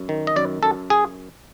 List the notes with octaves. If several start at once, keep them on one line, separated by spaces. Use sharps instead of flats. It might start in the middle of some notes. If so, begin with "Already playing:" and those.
Already playing: F#2
D#3
D#5
F#2 D5
F#2 A4
G#4